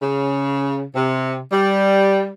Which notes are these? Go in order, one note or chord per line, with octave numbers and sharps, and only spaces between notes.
C#3
C3
G3